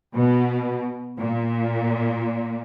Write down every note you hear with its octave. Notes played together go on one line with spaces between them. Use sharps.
B2
A#2